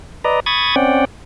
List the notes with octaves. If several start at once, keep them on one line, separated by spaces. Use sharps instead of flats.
B4 D5 D#5 A#5
B5 C#6 D#6 G#6 A6
C4 C#4 D5 F#5 G5